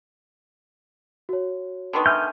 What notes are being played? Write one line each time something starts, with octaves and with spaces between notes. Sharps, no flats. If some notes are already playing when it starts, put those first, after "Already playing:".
F#4 C#5
D3 D#3 B3
E5 G#5 F6 G6